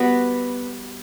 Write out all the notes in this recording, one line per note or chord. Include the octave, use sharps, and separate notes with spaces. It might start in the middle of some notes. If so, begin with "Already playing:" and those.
Already playing: G3 B3 F#4 B4